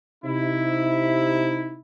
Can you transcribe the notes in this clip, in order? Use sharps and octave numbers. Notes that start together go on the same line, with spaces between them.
C3 D#4 E4